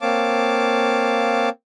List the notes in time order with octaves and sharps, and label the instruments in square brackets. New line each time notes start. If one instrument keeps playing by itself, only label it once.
[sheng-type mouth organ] A#3 C4 C#5 F5 A5 D6